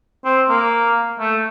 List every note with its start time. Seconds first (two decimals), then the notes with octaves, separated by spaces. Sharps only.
0.25 C4
0.49 A#3
1.19 A3